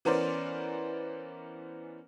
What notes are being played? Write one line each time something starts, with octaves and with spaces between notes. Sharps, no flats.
E3 B3 C#4 A#4 C5 D5